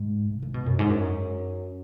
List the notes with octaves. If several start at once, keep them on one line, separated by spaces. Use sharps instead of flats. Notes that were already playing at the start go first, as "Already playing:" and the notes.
Already playing: G#2
C#3
C#3
B2
F#2
G#2
F#2